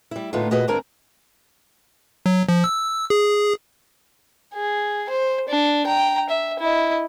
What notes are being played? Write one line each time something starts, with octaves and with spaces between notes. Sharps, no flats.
G3 E4
A2 D3 B3 D#4 F4
A#2 F#4 G#4 B4 D#5
D2 G2 C4 D4 A#4 G#5
F#3
F3
E6
G#4
G#4
C5
D4
G5 A#5
E5
E4 D#5